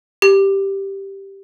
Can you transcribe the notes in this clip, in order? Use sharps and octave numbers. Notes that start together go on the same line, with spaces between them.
G4